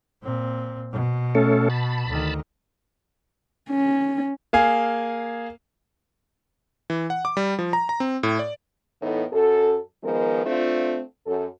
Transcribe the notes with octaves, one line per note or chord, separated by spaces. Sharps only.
A#2 C4
B2
A3 C#4 A4
A5 B5
D2 D#3
C#4
A#3 G#4 F5 G#5
E3
F#5
D6
G3
F3
A#5
A#5
C4
A2
D5
A2 E3 B3 D#4 A4
F#2 A4
D#3 F3 G#3 B3 A#4
A3 C4 D4 F4
F#2 A4